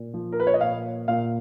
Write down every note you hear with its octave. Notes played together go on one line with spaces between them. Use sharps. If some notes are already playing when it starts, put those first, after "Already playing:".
Already playing: A#2
F3
A#4
B4
C#5
D#5
A#2 F5
A#2 F5